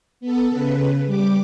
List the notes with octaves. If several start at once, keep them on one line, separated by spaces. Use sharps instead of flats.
B3 A4
C#3 B4
G3 D6